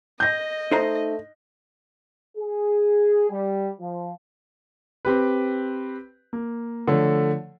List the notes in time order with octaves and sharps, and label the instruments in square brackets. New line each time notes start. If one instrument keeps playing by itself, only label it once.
[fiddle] D#5 [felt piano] G6 A#6
[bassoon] A3 [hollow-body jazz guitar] D#4 C5 A#5
[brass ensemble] G#4
G3
F3
[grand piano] C4 G4 B4
A#3
D3 F3 A3 C#5